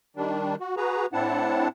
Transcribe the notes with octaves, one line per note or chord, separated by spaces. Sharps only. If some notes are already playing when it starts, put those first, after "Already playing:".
D#3 G3 D4
F#4
F#4 G#4 B4 A#5
A2 C4 D4 E4 F#5 A5